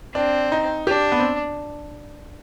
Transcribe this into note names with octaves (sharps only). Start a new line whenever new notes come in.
C4 D4
D#4
D4 G4
B3
C4